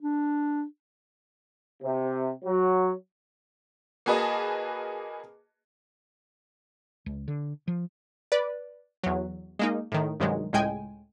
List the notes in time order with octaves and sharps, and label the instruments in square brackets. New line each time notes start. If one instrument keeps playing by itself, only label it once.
[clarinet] D4
[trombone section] C3
F#3
[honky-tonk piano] A#3 F#4 G#4 B4 D#5 A5
[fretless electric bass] C#2
D3
F3
[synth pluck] B4 D5
E2 F#3
G#3 A#3 D#4
A2 D#3
G2 C3 D#3 F#3 G#3
C#2 A2 G#3 G5 G#5